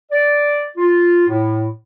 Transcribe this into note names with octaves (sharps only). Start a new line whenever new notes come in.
D5
F4
A2